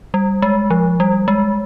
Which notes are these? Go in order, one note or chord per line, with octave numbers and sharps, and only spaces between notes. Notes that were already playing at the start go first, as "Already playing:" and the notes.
G3
G#3
F3
G3
G#3